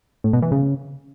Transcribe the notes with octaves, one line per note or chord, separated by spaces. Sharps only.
A2
B2
E3
C#3